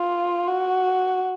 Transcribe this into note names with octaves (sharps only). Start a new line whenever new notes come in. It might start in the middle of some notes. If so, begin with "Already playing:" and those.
Already playing: F4
F#4